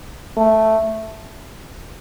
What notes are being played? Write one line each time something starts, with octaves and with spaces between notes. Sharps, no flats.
A3